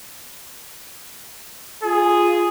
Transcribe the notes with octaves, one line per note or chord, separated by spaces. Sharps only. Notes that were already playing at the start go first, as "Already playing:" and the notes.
F4 G#4